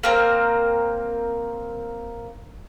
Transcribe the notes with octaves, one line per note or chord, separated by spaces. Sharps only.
A#3 C4 A#4